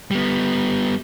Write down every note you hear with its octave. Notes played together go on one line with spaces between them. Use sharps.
G3 B3